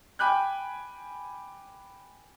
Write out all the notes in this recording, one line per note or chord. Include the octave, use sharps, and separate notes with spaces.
G5 G#5 B5 D6 F#6 G6